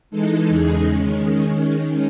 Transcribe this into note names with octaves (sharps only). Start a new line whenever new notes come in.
E3 G#3 D#4 A4
E2 C#3 G#3 D#4 G#4
D#3 G#3 C#4